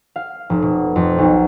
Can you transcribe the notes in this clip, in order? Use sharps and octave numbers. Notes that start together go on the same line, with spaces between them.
F5
F1
B2
F2
B1